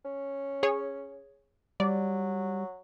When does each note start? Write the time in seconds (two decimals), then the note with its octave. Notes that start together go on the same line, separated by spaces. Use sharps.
0.05 C#4
0.63 G#4 C#5
1.80 F#3 G3 D5